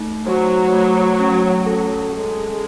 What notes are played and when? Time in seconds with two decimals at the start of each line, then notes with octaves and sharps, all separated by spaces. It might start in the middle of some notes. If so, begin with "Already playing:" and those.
Already playing: A3 D#4
0.26 F#3 C5
0.72 A3
1.20 C#4
1.66 A4
2.13 G#3 A4